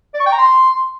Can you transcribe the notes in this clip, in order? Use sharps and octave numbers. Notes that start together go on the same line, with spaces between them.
D5
C#6
G5
A#5
C6